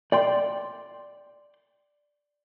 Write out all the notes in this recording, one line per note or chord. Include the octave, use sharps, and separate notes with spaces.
D5 G5 C6